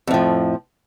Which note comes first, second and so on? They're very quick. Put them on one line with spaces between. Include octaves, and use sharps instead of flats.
F2 A2 F3